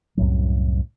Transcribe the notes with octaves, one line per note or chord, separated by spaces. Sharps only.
C2 F#2 A2 F#3